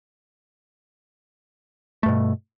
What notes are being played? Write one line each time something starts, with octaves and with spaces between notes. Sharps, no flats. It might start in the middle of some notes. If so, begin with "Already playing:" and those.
G2 B2 A3